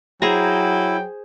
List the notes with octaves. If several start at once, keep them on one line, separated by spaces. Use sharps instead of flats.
F#3 E4 G#4 C5 G5 A#5